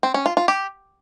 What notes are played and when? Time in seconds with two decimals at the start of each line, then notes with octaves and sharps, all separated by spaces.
0.03 C4
0.14 C#4
0.26 F4
0.37 F4
0.48 G4